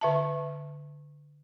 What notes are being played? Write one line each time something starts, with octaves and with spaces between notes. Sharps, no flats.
D3 E5 A5